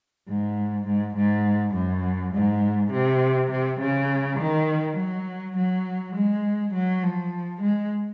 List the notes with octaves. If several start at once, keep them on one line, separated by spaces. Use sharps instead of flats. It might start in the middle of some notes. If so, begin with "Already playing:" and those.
G#2
G#2
G#2
F#2
G#2
C3
C3
C#3
D#3
F#3
F#3
G#3
F#3
F3
G#3